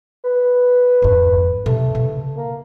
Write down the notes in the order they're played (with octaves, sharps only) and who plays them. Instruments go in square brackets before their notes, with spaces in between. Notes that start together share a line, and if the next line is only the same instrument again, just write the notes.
[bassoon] B4
[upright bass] F2 G#2
[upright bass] C3 D#4 [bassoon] A3
[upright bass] C#3
[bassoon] A#3